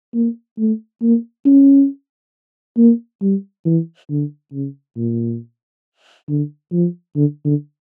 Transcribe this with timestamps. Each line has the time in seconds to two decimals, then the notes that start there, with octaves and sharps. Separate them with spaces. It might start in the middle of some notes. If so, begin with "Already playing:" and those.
0.14 A#3
0.58 A3
1.02 A#3
1.46 C#4
2.77 A#3
3.21 G3
3.65 E3
4.10 D3
4.53 C#3
4.97 A#2
6.28 D3
6.72 F3
7.16 D3
7.45 D3